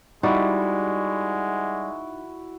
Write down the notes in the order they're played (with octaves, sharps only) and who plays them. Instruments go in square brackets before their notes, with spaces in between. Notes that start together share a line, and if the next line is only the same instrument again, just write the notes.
[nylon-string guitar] G3 [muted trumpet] G#3 [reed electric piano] D#4 [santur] E4 F#4